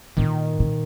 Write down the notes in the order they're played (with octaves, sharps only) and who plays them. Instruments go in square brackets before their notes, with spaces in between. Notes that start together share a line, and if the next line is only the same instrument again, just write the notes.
[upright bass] A#2 [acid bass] D#3
[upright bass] A#2